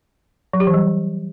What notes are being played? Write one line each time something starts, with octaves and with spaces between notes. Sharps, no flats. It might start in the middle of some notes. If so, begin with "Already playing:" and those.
F#3
G4
E3
G3